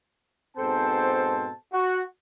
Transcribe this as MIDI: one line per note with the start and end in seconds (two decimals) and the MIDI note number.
0.57 1.50 44
0.57 1.50 47
0.57 1.50 60
0.57 1.50 69
0.57 1.50 72
0.57 1.50 81
1.73 2.02 66